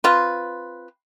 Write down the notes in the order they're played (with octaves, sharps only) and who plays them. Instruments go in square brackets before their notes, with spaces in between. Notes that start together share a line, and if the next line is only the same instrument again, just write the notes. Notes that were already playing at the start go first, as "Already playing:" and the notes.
[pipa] C4 F4 B4